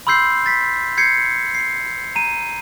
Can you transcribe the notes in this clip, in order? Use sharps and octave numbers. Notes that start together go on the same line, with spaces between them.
B5 C6 E6 G6 C7
A6 B6
G6 G#6 C7 C#7
C7
A#5 D#7